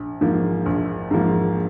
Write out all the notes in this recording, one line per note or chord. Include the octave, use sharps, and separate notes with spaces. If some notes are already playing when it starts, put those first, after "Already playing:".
Already playing: A#1
G#2 F3 A#3
A#1
G#2 F3 A#3